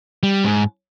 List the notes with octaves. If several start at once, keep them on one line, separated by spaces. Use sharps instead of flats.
G3
G#2